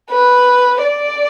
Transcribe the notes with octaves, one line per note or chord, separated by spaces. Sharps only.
B4
D5